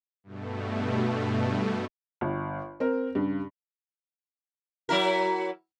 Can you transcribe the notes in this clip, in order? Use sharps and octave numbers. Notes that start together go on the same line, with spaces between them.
G2 B2 A3
G1
C4 A#4
G2 C#3
F#3 E4 A#4